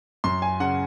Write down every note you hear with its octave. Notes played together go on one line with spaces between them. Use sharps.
F#2 C6
G#5
C#3 F#5